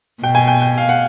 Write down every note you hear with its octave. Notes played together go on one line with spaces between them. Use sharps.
B2 G5
G#5
G5
G5
F5
F#5